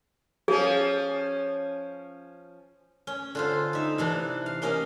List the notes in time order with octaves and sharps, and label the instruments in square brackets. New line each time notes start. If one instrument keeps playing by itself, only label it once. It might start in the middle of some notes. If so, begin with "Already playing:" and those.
[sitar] F3 C#4 [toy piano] G#4
[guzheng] C#4
D3 F4 C5
D#4 E5
C3 E3 D4
F5
A#3 C#4 G4 D#5 F5